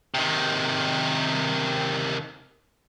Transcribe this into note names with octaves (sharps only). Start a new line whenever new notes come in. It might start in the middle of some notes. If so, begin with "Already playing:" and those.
C3 D#3